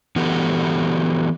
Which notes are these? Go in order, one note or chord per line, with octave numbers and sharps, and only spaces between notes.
E3 B3 F#4 G4 A4